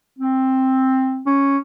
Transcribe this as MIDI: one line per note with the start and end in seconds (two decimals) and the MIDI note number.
0.19 1.25 60
1.26 1.58 61